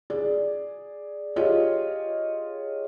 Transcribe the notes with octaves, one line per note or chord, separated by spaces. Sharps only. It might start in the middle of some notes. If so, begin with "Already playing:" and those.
G#4 D5
F4 G4 G#4 C#5 D#5